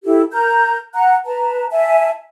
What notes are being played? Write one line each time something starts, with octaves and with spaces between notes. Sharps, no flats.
E4 G4 A4
A#4 A#5 G6
F#5 A#5 F#6
B4 A5 A#5
E5 G#5 A5